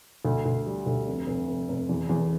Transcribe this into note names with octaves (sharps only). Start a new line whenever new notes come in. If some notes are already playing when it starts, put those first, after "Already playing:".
D2
D2
G3
D2
F1
F1
F1
F1
E2
E2